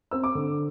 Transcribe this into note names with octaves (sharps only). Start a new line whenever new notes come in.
C4 E6
D6
D3